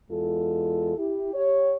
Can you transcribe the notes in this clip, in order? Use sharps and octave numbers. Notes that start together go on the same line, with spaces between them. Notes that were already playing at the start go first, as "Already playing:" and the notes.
E2 G#3 F4 A4
E4 G4
G4 C#5